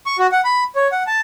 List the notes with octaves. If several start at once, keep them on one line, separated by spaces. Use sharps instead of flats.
C#6
F#4
F#5
B5
C#5
F#5
A5